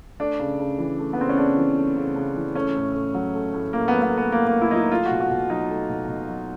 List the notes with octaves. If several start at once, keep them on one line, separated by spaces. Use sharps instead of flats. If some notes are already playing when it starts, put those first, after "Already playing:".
A3 D4
C#3
C#3
E3
A3
B3
C#3 C4
C#4
C#3 D4
E3
A3
C#3
C#3
E3
A3 C#4
A2
A2
F#3
A3
A2
A2 A#3
F#3 B3
B3
A3
B3
A2 A#3
A2 A#3
E4
F#3 D#4
E4
A3 F4
B2 F#4
F#4
B2
F#3 D#4
A3
B2
B2
F#3